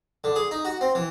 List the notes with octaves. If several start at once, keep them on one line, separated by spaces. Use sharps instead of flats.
D3
G#4
D#4
F#4
C4
E3